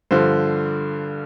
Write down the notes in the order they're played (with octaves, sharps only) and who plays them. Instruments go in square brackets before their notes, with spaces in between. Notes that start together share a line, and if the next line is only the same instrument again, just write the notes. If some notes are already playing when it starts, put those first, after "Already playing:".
[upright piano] G2 D3 F3 C5